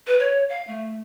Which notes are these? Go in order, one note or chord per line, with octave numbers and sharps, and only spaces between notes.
B4
C#5
F5
A3